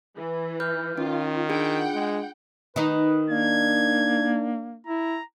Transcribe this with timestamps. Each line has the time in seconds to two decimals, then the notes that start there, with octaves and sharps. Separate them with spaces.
0.17 E3
0.60 B4 F6 G6
0.98 D#3 C#4 F4
1.49 D4 F4 G#4 F#5 G5
1.94 G#3
2.76 D#3 D#4 B4
3.30 A#3 D4 G#6
4.86 E4 A#5